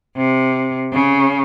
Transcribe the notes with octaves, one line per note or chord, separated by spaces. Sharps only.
C3
C#3